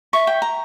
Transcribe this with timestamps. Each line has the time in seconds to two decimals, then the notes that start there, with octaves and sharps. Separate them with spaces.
0.13 E5 C#6
0.27 G5
0.42 A#5